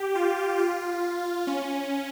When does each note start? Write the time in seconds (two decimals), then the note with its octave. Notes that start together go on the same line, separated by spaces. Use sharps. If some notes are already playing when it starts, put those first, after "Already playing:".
Already playing: G4
0.15 F4
0.59 F4
1.47 C#4